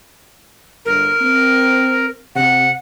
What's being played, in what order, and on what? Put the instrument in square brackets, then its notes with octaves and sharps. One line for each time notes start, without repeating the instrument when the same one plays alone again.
[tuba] G1 [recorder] A#4
[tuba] C4
[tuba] C3 [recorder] F#5